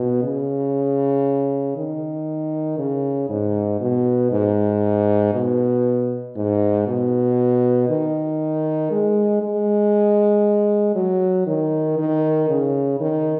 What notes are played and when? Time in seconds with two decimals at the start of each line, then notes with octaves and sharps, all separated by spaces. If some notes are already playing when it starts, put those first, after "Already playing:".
Already playing: B2
0.23 C#3
1.76 D#3
2.79 C#3
3.30 G#2
3.81 B2
4.32 G#2
5.34 B2
6.36 G#2
6.87 B2
7.89 D#3
8.91 G#3
9.43 G#3
10.96 F#3
11.47 D#3
11.98 D#3
12.49 C#3
13.00 D#3